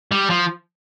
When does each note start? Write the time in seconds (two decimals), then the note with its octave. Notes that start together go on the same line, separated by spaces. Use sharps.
0.12 G3
0.30 F3